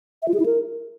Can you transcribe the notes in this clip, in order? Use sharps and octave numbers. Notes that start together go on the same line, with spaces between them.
E5
F4
G#4
E4
A#4